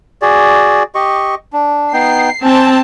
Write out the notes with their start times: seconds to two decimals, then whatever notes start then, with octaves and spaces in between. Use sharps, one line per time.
0.22 F#4 G#4 D5
0.95 G4 D#5 C#6
1.53 D4
1.93 B3 D#4 G5 C7
2.44 C4 G#5 A5